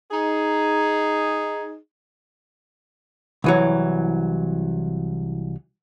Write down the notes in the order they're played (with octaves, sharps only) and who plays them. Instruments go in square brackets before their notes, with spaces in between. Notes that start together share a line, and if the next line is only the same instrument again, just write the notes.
[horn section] D#4 G#4
[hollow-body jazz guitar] C2 E3 F#3